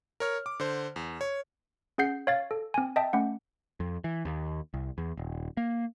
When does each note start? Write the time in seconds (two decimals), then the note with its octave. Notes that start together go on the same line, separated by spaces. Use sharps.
0.20 A#4 C#5 F6
0.46 D6
0.60 D3 C5
0.96 E2
1.21 C#5
1.98 C#4 G#4 F#5 G6 C7
2.27 C#5 F5 A6
2.51 A4
2.74 C4 G#5
2.96 D#5 E5 G5 A5
3.13 A3 C#4 F#5
3.80 F2
4.04 E3
4.25 D#2
4.74 C2
4.98 E2
5.17 D#1
5.57 A#3